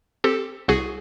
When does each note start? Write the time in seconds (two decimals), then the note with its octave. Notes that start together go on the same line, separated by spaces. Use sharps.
0.24 C4 G4 A4
0.68 C2 F#4 G#4